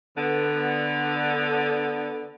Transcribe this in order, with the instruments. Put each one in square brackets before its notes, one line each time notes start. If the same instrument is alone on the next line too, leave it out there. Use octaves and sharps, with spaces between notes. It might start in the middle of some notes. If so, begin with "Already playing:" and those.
[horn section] D3 B3